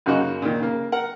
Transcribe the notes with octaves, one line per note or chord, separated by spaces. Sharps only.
F#2 C#3 A#3 D#4 F#4
A#2 D#3
C#3 A#3
A#4 F#5